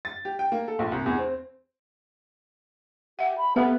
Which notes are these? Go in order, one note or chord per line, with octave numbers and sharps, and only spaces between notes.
A6
G4
G5
A#3
A4
A#1
C2
E2
C4
G4 E5 F#5
B5
B3 G4 A4 E5 F5